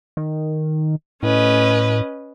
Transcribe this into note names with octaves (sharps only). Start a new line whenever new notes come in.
D#3
A2 C#4 B4 D#5